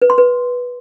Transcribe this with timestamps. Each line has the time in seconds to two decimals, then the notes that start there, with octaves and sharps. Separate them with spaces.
0.02 B4
0.10 C6
0.18 B4